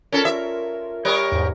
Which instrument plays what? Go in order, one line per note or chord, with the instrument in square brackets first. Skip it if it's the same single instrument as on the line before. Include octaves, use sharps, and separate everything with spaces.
[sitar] C#4 A4 [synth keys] F4 A#4
[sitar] E5
G3 A#4 C#5
[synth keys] E2 G#2